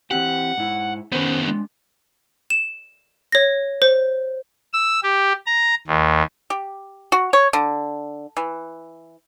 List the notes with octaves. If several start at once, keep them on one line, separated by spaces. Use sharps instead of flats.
E3 C4 G4 F#5
G#2 E4
D#3 B3 C#4 A#4 C5
G#3 D4
E7
C#5 A#6
C5
E6
G4
A#5
D#2
G4
F#4
C#5
D3
E3